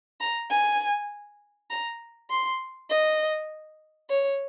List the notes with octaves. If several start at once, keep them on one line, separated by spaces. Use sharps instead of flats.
A#5
G#5
A#5
C6
D#5
C#5